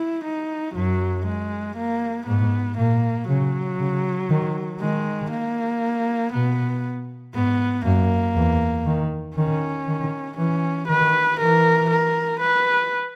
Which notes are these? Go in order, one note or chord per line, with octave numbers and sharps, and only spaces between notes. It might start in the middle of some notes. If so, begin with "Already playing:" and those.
Already playing: E4
D#4
F#2 F#3
G#3
A#3
G#2 B3
A#2 A#3
C#3 F#3
C#3
D#3
D#3 G#3
A#3
B2 B3
G#2 B3
F#2 A#3
E2
D#3
D#3 C#4
D#3
E3 C#4
D#3 B4
E3 A#4
A#4
B4